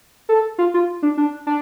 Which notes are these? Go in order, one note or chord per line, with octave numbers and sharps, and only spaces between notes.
A4
F4
F4
D4
D4
D4